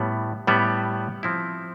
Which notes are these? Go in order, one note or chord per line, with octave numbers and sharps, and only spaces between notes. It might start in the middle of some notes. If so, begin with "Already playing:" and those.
Already playing: A2 G3 B3
A2 G3 B3
F3 C4 E4